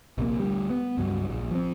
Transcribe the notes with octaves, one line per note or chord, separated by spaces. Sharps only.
A#1 C3 A#3
D2 G3
B3
C#2 G2 F#3
A#1
F3 C4